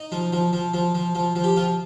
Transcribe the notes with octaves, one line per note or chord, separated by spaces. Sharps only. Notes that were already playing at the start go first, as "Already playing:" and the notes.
Already playing: D#4
F3
F3
F3
F3
F3
F3
F3
G4
F3 F4